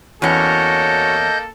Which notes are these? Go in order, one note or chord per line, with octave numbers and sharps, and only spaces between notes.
E2 A#3 C#4 F#4 A4 C#5 D#5 G6